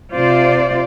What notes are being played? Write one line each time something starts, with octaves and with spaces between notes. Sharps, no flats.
C3 F4 C5 D5